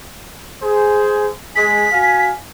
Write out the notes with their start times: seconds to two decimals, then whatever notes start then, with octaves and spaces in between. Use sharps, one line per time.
0.62 G#4 C5
1.56 G#3 G#4 B6
1.92 F#4 F5 G#5